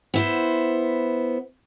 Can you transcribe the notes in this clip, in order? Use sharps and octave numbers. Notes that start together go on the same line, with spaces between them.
B3 E4 C5